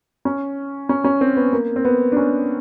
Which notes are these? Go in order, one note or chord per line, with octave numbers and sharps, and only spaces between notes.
C#4
C#4
C#4
C4
B3
A#3
C4
B3
D4
C#4